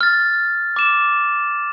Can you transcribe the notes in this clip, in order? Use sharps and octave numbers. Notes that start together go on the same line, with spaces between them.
F6 A6
D6 E7